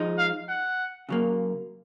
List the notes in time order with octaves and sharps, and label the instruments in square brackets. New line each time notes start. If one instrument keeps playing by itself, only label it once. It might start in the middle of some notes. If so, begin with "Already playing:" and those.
Already playing: [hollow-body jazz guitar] F3 G#3 D#4
[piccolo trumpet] F5
F#5
[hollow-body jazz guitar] C#3 F#3 A#3